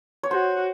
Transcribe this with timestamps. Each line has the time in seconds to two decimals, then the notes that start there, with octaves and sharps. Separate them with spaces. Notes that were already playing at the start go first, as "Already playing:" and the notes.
0.23 C#5
0.31 F#4 C5